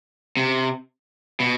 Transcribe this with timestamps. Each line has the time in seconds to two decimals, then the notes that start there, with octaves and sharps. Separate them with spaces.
0.37 C3
1.40 B2